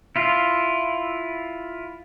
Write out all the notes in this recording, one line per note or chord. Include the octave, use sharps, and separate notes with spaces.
E4 F4